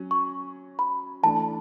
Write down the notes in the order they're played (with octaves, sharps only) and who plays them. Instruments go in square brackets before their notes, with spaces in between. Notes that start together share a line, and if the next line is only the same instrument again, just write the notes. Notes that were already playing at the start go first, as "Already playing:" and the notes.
Already playing: [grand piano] F#3 C#4
[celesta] C#6
B5
[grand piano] E3 A3 D4 [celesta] A5